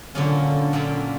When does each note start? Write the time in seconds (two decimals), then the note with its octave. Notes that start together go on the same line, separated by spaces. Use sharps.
0.15 A#2 D3 F#3 A#3 C#4 F4
0.73 A#2 F#3 A#3 C#4 F4